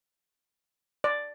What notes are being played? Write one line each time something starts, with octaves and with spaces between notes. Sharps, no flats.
D5